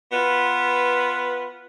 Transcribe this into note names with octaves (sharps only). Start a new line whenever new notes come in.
B3 F4 B4